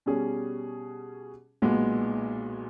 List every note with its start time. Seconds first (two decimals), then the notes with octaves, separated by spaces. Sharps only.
0.06 B2 G3 C#4 G#4
1.62 B1 A#2 G#3 B3